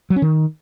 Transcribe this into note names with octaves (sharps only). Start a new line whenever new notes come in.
F#3
C#4
D#3